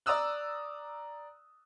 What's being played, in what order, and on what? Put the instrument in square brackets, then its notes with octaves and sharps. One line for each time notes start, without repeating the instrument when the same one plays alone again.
[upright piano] D5 A#5 D#6 E6 F#6